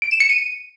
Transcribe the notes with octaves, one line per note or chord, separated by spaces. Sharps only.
D7
E7
C#7
D#7